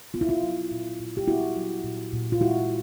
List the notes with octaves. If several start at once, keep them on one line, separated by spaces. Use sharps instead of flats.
B3 F4
E4
F4
F#3
A#2
A#2
G4
B3 E4 F#4
F#3
A#2
A#2
F4
G#3 E4 F#4